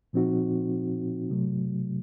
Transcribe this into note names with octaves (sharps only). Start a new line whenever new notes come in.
A#2 F3 C4 D#4 F#4
C3 F#3 A3